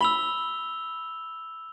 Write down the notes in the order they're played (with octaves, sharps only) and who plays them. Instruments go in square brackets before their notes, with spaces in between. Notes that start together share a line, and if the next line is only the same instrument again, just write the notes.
[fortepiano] B5 [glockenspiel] E6 F7 G7